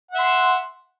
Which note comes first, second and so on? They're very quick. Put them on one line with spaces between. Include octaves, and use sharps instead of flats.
F#5 E5 C6